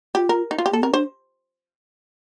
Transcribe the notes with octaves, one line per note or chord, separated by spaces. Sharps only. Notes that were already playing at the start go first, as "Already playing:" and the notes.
F4 G4
A#4
D#4
F4
G4
A#3 A4
C4 A#4
D4 C5